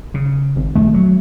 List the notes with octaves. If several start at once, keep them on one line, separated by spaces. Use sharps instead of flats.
C#3
G#1
A#1 D#2 A3
F#3